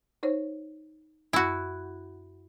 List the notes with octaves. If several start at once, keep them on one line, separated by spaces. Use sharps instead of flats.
D#4 C5 C#5
F#2 E4 F#4